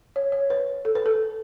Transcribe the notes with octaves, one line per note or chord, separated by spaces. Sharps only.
C#5
C#5
B4
A4
B4
A4